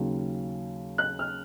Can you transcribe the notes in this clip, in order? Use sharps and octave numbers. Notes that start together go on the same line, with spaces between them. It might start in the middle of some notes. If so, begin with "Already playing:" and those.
Already playing: D#2 C#3 F#3
F#6
F6